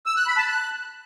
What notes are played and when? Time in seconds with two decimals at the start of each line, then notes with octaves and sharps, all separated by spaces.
0.06 E6
0.17 F#6
0.27 B5
0.37 A5
0.48 F#6